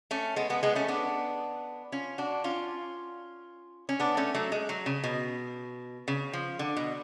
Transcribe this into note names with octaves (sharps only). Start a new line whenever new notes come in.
A3 C#4
G#3 B3
G#3 B3
G#3 B3
A3 C#4
B3 D4
C#4 F4
D4 F#4
C#4 F4
C#4
B3 D4
A3 C#4
F#3 A3
G#3
F#3
C#3
B2
C#3
F3
D3
B2